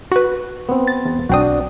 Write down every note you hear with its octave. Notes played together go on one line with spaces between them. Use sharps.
F#4 B4
B3 C4
A6
E2
B1 C4 D4 F#4 D#6